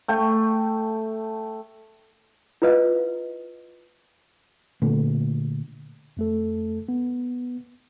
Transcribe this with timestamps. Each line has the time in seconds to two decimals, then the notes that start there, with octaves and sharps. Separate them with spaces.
0.08 A3 G5
2.62 E4 F4 B4 D#5 F5
4.82 A#2 D3 A3
6.17 F2 A3 A4
6.89 B3